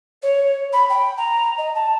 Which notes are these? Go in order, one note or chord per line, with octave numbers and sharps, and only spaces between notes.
C#5
B5
G5
A#5
D#5
A5